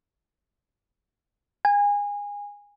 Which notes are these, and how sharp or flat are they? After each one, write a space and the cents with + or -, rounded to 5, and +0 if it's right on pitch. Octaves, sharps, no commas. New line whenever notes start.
G#5 -25